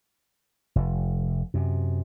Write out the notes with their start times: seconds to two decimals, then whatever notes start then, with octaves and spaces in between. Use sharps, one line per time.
0.76 F1
1.54 F#2 C3